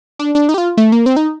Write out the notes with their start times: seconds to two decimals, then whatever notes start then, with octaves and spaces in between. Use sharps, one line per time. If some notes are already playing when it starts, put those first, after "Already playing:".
0.19 D4
0.35 D4
0.49 D#4
0.54 G4
0.58 F4
0.77 A3
0.92 A#3
1.06 C4
1.16 D#4